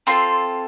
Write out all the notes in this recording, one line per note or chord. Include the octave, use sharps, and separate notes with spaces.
C4 F4 A4 C6